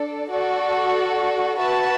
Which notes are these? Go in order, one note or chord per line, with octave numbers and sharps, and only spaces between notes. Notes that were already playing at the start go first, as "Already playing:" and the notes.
Already playing: D4 A4 D5
F#4 A4 D5
F#4 B4 E5 A5